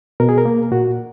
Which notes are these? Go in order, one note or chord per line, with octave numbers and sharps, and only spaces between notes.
B2 A#4
G#4
A#4
A#3
A#2 F#4